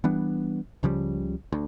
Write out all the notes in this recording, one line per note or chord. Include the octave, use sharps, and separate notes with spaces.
E3 G3 B3 D4
C#2 C#3 F3 G3
D2